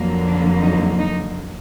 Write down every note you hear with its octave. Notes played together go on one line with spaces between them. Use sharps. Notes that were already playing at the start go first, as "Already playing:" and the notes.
Already playing: F2 D3 F#3 A#3
D4
D#4
D#4